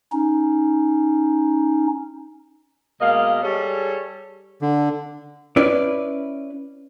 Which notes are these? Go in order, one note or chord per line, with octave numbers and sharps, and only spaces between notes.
C#4 D#4
B2 G#3 A#3 D#5 F5
G3 G#4 A4 C#5
D3
C#4 E4 B4 D5